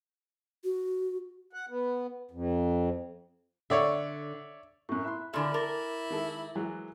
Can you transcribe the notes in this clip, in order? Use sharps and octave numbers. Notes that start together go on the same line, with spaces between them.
F#4
F#5
B3
F2
D3 C#5 D5 E5 F#5
F#2 A2 C#6 F#6
E4 E5 B5 C6 F#6
A#2 D3 E4 A4 D5 G#5 B5 F6
A#4 D6 A6 A#6
D#3 G#3 A4
E3 F#3 G#3